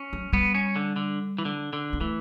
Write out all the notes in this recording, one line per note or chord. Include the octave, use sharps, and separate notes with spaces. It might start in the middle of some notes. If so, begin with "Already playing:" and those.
Already playing: C#4
F#3
G3 B3
C#4
D3
D3
E3
D3
D3
B3
E3 A3